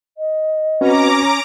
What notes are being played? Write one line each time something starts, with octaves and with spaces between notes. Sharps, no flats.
D#5
C4 C#4 F#4 B4 A#5 D6